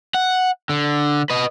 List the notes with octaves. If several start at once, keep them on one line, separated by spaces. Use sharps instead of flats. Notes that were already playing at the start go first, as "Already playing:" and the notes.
F#5
D3
B4 D#5